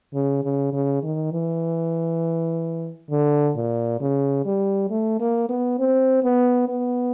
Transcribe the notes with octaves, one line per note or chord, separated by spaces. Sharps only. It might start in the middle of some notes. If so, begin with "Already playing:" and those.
C#3
C#3
C#3
D#3
E3
D3
A#2
C#3
G3
A3
A#3
B3
C4
B3
B3